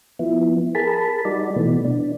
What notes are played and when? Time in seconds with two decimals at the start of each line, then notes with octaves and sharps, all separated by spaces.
0.19 F3 B3 E4
0.75 G#4 A#4 A5 B5
1.25 G3 D#4 F#4 D5
1.56 B2 E3 A3 B3
1.85 D4